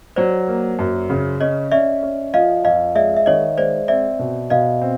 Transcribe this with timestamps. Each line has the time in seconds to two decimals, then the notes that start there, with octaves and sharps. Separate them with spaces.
0.16 F#3 C5 D5
0.48 A#3
0.79 F#2
1.10 C#3
1.40 C#4 C#5 D#5
1.72 C#4 D5 E5
2.03 C#4
2.34 F3 D#5 F5
2.64 F2 D#5 F5
2.95 G#3 D5 E5
3.17 E5
3.26 D#3 C#5 D#5
3.57 G#3 C5 D5
3.88 C4 D5 E5
4.19 B2
4.50 B2 D#5 F5
4.81 C4